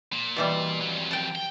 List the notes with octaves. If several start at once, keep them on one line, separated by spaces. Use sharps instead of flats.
A#2
B2 E3 G3
F2 F#3
G5 A5
G5